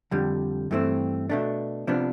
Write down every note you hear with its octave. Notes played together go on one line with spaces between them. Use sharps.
F2 D3 G3
G2 E3 A3 C4
B2 A3 D4
C3 F3 B3 D4